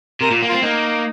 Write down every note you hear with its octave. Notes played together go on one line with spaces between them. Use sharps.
C3 A#4
A#2
A#3
C4 F4
A#3 D#4